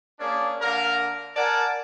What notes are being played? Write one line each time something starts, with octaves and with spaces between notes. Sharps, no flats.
A#3 C#4 D4 G#4 D5
D3 A#3 A#4
A#4 D5 F#5 G#5 A5